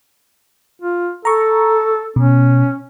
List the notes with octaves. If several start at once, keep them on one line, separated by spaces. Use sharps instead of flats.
F4
A4 A#5 C#6
B2 C#4